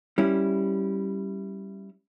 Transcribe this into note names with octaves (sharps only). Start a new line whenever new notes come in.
G3 C#4 E4